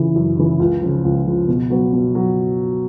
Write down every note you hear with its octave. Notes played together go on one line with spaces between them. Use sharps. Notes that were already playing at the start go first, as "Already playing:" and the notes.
Already playing: C#3 E3
F#2
C#3 E3
C#2
C#3 F3
C#2
C#3 F3
B2
F#3 B3
B2
F#3